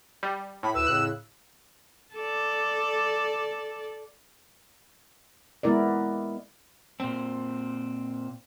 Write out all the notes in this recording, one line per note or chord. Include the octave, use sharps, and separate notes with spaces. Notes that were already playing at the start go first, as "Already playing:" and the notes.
G3
A2 B5
D2 E4 B4 E6
F2 A2 C#3 F#6
A4 D5
G#3 B3 E4 A#4 D5
A#2 C4